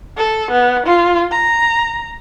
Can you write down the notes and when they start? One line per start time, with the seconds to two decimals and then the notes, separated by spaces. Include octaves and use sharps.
0.17 A4
0.51 B3
0.86 F4
1.31 A#5